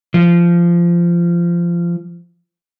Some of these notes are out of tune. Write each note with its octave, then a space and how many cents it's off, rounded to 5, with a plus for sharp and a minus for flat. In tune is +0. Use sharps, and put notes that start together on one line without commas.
F3 -20